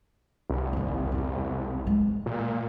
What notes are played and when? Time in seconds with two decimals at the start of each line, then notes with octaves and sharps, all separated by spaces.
0.50 C2
0.73 F#1 D#2
1.12 E2 A3
1.87 E3 G#3
2.26 A#2